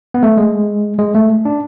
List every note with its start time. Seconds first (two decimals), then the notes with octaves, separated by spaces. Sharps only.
0.14 B3
0.23 A3
0.37 G#3
0.99 G#3
1.15 A3
1.45 D4